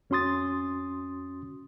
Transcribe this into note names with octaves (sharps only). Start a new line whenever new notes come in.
F2 C#4 F#4 C6 D#6 A6